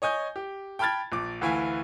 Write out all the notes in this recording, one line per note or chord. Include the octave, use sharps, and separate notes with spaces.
C#5 D#5 G#5 G6
G4
G5 A5 B5 F6 G#6 A6
A#1 D6
D2 E3 E4 F5 G#5